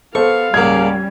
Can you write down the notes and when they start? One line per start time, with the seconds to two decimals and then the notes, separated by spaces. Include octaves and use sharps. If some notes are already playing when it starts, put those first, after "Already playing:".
0.15 B3 A4 C5 F5 C#6
0.54 C#2 G#2 G3 A#3 C#4 G#6